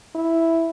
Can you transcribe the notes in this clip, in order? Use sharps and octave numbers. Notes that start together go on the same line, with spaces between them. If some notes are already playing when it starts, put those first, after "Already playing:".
E4